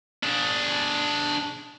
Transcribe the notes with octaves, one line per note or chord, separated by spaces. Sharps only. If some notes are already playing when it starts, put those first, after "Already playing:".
D4 G#4